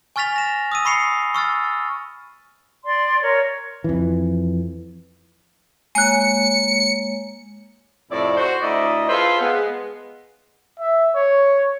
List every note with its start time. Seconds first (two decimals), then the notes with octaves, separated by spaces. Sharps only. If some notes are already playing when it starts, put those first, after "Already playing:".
0.16 G#5 C#6 F6 A6 B6 F7
0.36 A#6 E7
0.72 D#6 E6 D#7
0.85 B5 C#6 C7 C#7 F7
1.34 C#6 E6 F6 A6
2.85 D5 C6
3.22 A#4 C#5
3.84 F2 E3
5.95 G#3 A#3 C#5 G#5 F#6 C#7
8.11 F2 A2 C3 E4 D5
8.37 F#4 C5
8.62 D2 E4 D5 D#5
9.09 F4 G#4 A4 B4 C5 F5
9.41 G#3 B3
10.79 E5
11.15 C#5